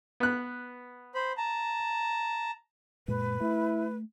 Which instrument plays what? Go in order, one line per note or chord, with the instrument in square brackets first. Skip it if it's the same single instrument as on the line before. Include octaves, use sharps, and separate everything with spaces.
[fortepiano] B3 F#6
[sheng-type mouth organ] C5 B5
A5 A#5
[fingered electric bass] F#2 A#2 G#3 [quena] B4
[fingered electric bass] A3 [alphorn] E4